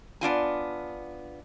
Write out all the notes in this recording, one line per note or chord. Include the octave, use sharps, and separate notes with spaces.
B3 D4 F4 G#5